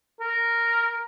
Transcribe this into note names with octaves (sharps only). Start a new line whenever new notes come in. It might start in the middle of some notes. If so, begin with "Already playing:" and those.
A#4